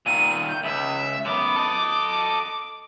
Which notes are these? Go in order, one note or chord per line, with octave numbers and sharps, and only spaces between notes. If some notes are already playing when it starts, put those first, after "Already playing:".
A#2 D#3 D#7
G6
C#2 E5
F#2 B3 D6
A4 D#5